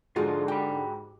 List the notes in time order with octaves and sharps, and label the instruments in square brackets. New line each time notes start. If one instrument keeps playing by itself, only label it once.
[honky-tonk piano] G#2 F#4 G#4 [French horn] D3 [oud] F3 G#3 [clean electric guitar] F4
[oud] G4 [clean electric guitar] G5 B5